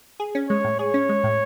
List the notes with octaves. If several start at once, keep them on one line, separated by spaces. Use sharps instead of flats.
G#4
C#4
G#3 C#5
A2
G#4 C#5
C#4
G#3
A2